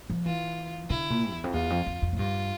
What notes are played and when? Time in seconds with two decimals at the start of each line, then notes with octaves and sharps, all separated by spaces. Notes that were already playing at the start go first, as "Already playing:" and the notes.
0.10 F3
0.25 E3 F4
0.90 D3 E4
1.10 A#2
1.33 E2
1.44 F2
1.54 E2 F4
1.70 F2
1.86 F2
2.02 F2
2.13 A2
2.18 G2 F4